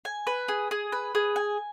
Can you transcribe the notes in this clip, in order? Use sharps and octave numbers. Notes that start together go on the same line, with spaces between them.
G#5
B4
G#4
G#4
B4
G#4
G#5